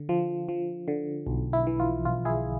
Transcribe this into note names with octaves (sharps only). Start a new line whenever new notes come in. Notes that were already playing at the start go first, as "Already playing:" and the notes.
Already playing: D3
F3
F3
D3
B1
E4
E3
F4
B1 F4
E4 G#4